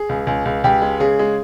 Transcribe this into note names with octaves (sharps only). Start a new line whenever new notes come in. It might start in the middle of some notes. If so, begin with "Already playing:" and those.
Already playing: G#4
C#2
C#2
C#2
C#2 G4
G#3
C#3 G#4
G#3